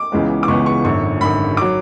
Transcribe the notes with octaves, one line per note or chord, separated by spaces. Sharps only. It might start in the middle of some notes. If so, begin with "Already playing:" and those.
Already playing: D6
C#2 C#3 E3 G#3 B3
D6
C#2 C#3 E3 G#3 B3 C#6
C#6
G#1 F#2 D3 C#6
G#1 F#2 D3 B5
F#3 D6